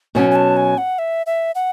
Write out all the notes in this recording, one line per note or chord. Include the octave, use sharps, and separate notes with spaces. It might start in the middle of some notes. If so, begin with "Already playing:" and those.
B2 F#3 C#4 G#5
G#5
A5
G#5
F#5
E5
E5
F#5